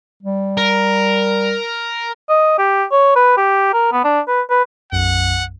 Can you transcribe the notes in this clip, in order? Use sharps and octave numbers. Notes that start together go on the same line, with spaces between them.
G3
A#4
D#5
G4
C#5
B4
G4
A#4
B3
D4
B4
B4
B1 F#2 F#5